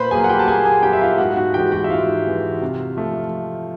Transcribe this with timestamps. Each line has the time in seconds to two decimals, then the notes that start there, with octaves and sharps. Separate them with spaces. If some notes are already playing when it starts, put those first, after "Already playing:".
Already playing: A#2 B4 C5 B5 C6
0.11 F#3 A#3 G#4 G#5
0.24 F#5
0.29 G4 G5
0.39 A5
0.47 A#2 G#4 G#5
0.65 G#4 G#5
0.83 F#3 A#3 G4 G5
0.93 E5
1.01 F4 F5
1.18 G#2 F#4 F#5
1.37 F#4 F#5
1.54 E3 G#3 G4 G5
1.72 F#4 F#5
1.84 E5
1.90 G#2 F4 F5
2.26 E3 G#3
2.61 C3
2.97 F3 A3